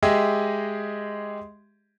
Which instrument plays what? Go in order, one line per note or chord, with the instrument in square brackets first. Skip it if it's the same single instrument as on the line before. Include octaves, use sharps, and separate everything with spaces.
[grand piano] G#3 G4 G#4 D#5 E5